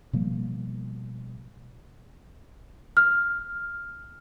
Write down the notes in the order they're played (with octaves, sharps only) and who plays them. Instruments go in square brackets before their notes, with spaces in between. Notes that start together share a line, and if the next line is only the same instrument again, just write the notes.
[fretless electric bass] B2 F3 G3 A#3
[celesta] F6